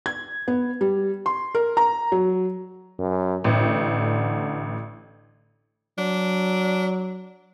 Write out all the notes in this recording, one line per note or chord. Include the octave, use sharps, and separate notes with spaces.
G#6
B3
G3
C6
A#4
A#5
F#3
F#2
A1 D3
F#3 D4